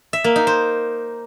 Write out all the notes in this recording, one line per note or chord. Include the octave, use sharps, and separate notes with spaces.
E5
A#3
D#4
C5